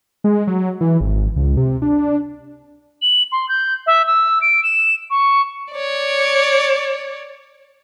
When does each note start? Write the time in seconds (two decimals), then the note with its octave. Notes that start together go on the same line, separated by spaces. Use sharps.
0.24 G#3
0.47 F#3
0.81 E3
1.01 G#1
1.36 C#2
1.57 C3
1.82 D4
3.02 F#7
3.32 C6
3.49 G6
3.87 E5
4.07 E6
4.42 D7
4.63 E7
5.10 C#6
5.72 C#5 D5